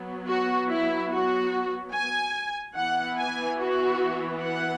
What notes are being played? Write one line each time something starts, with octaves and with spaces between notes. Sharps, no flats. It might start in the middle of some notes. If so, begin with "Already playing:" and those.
Already playing: F#3 B3
F#4
E4
F#4
G#5
E3 B3 F#5
G#5
F#4
F#5